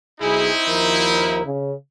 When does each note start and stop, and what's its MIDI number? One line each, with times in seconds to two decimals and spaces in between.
0.21 0.50 35
0.21 1.47 60
0.21 1.47 63
0.21 1.47 64
0.21 0.50 68
0.68 1.43 39
0.68 1.43 53
0.68 1.43 70
1.45 1.74 49